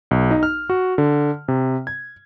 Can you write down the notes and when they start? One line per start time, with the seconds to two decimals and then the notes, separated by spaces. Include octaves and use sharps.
0.11 B1
0.31 D#4
0.43 F6
0.70 F#4
0.98 D3
1.48 C3
1.87 G#6